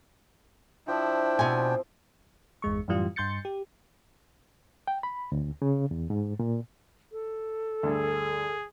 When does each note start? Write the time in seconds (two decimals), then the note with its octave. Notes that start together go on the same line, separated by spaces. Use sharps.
0.88 F3 D4 E4 G5
1.39 B2 C4 G#5
2.62 G1 E2 G#3 C#6
2.88 F#2 A2 E3 G3 F4
3.16 G2 C6 G6 A6 C#7
3.45 G4
4.87 G5
5.03 B5
5.32 D2
5.62 C#3
5.91 E2
6.10 G#2
6.39 A#2
7.12 A4
7.83 D2 G2 G#4